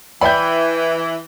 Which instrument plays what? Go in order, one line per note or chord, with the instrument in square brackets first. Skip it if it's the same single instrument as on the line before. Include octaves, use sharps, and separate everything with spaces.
[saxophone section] E3 [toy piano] D5 G5 [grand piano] B5 G6